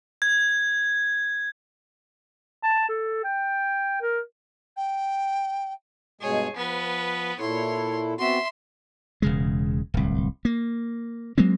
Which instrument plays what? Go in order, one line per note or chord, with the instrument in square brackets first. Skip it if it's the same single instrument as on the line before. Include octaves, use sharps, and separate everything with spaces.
[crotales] G#6
[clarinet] A5
A4
G5
A#4
[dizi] G5
[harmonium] G2 B2 G#3 [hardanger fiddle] G#4 C#5
[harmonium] F3 [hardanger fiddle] B3 B4
[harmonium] A#2 E4 A4 [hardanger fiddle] C#5 C6
[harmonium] B3 C4 F#4 [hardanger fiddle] E5 C6
[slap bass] E1 C#3 G#3
D1 C2
A#3
F#3 G#3 A#3 C4